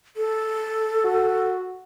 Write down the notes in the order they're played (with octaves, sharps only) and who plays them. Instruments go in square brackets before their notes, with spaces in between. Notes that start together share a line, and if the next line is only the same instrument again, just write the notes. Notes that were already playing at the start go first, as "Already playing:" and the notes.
[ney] A4
[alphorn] F#4